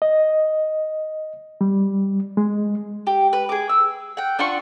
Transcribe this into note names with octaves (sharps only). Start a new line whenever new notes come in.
D#5
G3
G#3
G4
B4
G#4 D6
E6
F#5 G5
D4 F4 F#5 C#6